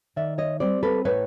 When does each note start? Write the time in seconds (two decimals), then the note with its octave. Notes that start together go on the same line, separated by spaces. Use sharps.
0.16 D#3 D5 E5
0.38 C#5 D#5
0.60 G3 C4 C5 D5
0.83 A4 B4
1.05 A2 B4 C#5